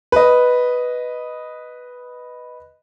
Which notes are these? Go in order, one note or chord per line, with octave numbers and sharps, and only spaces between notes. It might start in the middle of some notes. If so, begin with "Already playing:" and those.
B4 D#5